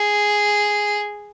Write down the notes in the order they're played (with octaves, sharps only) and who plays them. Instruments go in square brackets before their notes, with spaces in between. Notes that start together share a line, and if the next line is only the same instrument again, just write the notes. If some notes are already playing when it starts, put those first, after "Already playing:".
Already playing: [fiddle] G#4